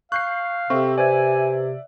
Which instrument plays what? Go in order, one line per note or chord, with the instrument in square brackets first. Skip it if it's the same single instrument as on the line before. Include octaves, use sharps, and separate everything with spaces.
[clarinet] F5 [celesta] C#6 [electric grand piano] F#6 G6 C7
[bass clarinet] C3 [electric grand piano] C4 E5 [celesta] A4 G5 C#6
[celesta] B4 C5 G#6 [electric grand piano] D5 E5 [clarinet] G#5